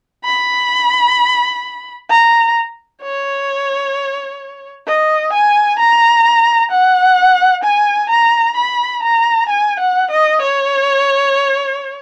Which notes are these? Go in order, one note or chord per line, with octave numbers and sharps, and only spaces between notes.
B5
A#5
C#5
D#5
G#5
A#5
F#5
G#5
A#5
B5
A#5
G#5
F#5
D#5
C#5